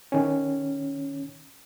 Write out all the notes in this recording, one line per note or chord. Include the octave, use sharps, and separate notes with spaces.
D#3 C#4